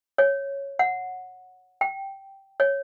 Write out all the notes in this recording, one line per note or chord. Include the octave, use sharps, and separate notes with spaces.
C#5
F#5
G5
C#5